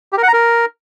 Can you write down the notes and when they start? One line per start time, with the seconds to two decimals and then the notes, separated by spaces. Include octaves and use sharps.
0.13 G4
0.18 A#4
0.23 F#5
0.28 A#5
0.33 A#4